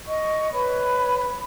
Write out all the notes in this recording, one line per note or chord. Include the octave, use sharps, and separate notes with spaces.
D#5 C#6
B4 C#5 B5